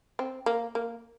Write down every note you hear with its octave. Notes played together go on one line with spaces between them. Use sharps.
C4
A#3
A#3